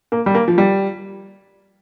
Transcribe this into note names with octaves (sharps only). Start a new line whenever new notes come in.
A#3
G3
A#3
F3
G3